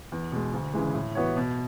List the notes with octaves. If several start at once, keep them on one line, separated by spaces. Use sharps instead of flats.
E2
B2 G#3
D2
C#3 E3 G#3
A2
E3 B3 F#4 C#5
B2